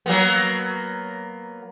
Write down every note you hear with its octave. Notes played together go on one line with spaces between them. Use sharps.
F#3 A#3 B3